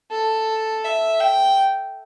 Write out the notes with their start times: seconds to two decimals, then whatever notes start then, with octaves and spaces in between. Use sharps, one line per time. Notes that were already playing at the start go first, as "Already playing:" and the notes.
0.11 A4
0.84 E5
1.20 G5